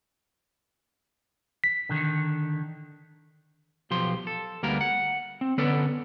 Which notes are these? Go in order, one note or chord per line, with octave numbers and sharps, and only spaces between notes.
B6
D3 D#3
B1 F3 G4 C6
A4
D2 G3 A#3 B3 A#4
F#5
C4
D3 B3 C#4 A4 B4 D5